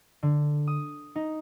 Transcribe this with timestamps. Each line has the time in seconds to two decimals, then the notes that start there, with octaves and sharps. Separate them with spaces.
0.23 D3
0.67 D#6
1.16 D#4